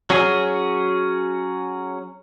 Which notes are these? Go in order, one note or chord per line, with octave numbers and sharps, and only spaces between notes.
F#3 C#4 F#4 G#4